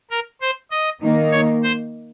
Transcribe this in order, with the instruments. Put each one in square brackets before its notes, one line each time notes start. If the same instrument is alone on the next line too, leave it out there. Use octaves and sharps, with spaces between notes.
[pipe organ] A#4
C5
D#5
[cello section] D#3 A#3 D#4
[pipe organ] C#5
C5